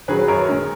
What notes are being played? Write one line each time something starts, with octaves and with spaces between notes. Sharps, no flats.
D#3 F#3 G#4 B4
B4
F#2 A#4 C#5
D#3 G#3